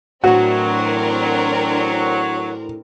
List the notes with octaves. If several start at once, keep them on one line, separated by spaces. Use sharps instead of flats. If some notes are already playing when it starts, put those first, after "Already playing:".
A2 E3 F#3 C4 D4 F#4 A#4